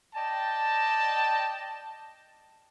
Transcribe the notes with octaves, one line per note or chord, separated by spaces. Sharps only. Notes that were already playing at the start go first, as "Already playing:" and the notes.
D5 D#5 G5 A5